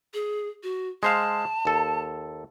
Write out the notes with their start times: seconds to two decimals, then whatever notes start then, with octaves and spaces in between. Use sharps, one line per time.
0.14 G#4
0.63 F#4
1.03 G#3 C5 F5 A5
1.65 D#2 A4